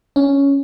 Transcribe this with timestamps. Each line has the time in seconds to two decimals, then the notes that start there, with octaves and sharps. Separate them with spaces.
0.16 C#4